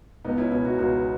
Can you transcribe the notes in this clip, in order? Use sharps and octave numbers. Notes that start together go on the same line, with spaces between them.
C#2 B3 D#4
C#4 E4
B2 C#4 E4
D#4 F#4
C#2 D#4 F#4